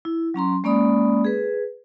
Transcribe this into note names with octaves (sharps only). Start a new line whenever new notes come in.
E4
F#3 C#4 A#5 C6
G#3 A#3 C#4 D5 B5 D#6
G#4 B4